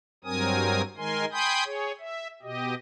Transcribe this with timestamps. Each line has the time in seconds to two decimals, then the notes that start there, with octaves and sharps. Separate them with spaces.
0.24 G2 F#3 C4 A#4 G#5 D#6
0.97 D#3 G#3 A#4 G#5 C6
1.32 G5 G#5 B5 C6 D#6 G6
1.65 G#4 C#5
1.99 E5
2.42 B2 G4 D#5